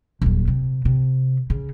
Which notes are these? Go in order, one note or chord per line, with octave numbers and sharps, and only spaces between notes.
D#1 F#3
C3
C3
C#3